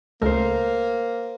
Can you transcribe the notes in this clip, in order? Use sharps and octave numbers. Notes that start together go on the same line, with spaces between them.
C#2 A3 A#3 A#4 C5